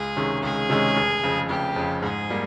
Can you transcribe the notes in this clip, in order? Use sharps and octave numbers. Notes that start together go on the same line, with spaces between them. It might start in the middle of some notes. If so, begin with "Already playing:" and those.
Already playing: C#2 G#4
C3 D#3 G#3 C#4
C#2 G#4
C3 D#3 G#3 C#4
F1
F2 C#3
F1 G4
F2 C#3
G#2 G#4
G3 A#3